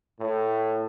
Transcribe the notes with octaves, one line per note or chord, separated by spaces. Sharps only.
A2